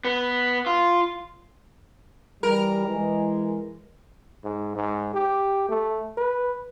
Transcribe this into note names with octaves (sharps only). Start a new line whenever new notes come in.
B3
F4
E3 G3 A#4
E3 G#3
G#2
G#2
G4
A3
B4